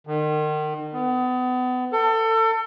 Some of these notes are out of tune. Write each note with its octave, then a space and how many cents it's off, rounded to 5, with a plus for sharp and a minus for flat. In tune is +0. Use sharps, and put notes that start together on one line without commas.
D#3 -35
B3 +30
A4 +30